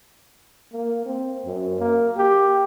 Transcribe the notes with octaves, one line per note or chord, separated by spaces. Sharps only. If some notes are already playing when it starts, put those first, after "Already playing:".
A#3
C4
F#2
A#3
G4